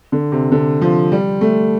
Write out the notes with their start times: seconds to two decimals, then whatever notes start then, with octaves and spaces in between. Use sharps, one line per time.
0.12 D3
0.32 C3
0.52 D3
0.82 F3
1.12 G3
1.41 A3